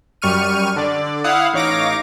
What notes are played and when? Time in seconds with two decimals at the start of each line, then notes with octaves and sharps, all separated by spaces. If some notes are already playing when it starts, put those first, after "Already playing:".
0.22 F#2 G3 C#6 F6 D#7
0.76 D3 D5
1.24 E4 F5 F#5 D#6
1.53 A1 D#4 C#5 F5 D6 A#6